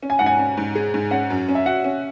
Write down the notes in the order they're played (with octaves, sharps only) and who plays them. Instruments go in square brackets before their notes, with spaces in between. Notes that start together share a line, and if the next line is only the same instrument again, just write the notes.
[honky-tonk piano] C#4
[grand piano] G#5
[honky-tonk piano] G#2 [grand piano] F#5
[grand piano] G#5
[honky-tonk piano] C#4
G#2
G#4
G#2
[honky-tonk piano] C#4 [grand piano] F#5
[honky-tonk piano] F#2
C#4
[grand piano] E5
[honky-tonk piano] F#4 [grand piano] F#5
[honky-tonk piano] C#4